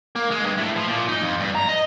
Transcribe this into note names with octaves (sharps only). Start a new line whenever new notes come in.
A#3
G#3
G2
A2
F3
A#2
D#4
F2
G2
A#5
D#5